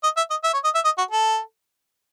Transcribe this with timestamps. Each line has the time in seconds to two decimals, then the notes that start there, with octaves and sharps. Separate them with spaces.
0.03 D#5
0.17 E5
0.30 D#5
0.44 E5
0.53 C#5
0.64 D#5
0.75 E5
0.85 D#5
0.98 F#4
1.11 A4